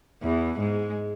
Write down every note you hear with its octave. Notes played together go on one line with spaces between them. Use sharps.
E2 E3
G#2 G#3